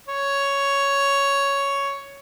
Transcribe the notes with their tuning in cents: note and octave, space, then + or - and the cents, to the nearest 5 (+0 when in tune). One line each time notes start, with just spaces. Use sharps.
C#5 +5